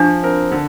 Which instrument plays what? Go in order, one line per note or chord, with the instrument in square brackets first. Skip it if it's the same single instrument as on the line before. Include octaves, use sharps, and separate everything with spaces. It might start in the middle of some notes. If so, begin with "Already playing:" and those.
Already playing: [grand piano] F3 [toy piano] D4
[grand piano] C4 A#4
D3